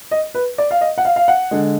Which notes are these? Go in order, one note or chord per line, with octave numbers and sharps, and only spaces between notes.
D#5
B4
D5
F5
D#5
F#5
F5
F5
F#5
D3 G#3